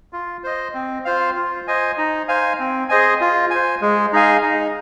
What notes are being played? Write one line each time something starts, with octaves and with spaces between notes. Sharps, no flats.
F4
C5 D#5
C4
F4 C5 F5
F4
C5 D#5 G#5
D#4
C5 F5 G#5
C4
G#4 C5 D#5 G#5
F4
C5 G#5
G#3
D#4 G#4 F5 G#5
D#4